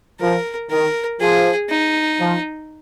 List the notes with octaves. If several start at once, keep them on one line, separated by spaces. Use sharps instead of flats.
F3 A#4
D#3 A#4
F3 G#4
D#4
F3